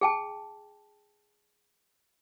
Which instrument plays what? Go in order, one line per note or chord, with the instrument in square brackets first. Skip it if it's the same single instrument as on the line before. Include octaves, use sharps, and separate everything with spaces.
[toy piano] G#4 G5 A5